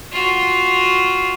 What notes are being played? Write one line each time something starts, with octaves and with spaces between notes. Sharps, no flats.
F4 F#4